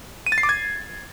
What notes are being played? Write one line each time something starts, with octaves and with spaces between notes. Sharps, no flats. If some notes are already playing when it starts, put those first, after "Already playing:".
D#7
A6
C7
D6
G#6